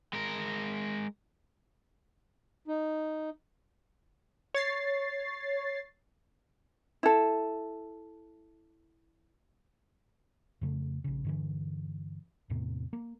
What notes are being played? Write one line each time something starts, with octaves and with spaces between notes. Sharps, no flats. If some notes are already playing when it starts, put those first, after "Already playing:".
G#3 A#4
D#4
C#5 A6 C7
E4 A4
F2 C#3 A3
A#1 C#3
G2 D3 E3
E2 A2 C3 B3
A#3